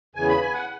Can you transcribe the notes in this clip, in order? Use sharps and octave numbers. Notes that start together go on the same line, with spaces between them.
E2 C#3 E3 G#5
B5
G#5
F#5